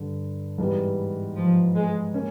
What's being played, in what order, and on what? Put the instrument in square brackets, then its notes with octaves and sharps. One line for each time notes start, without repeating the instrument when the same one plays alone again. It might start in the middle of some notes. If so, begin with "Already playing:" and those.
Already playing: [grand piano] G2 D3
G#2 E3 G3 B3
[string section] F3
G#3
[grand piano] A#3 C#4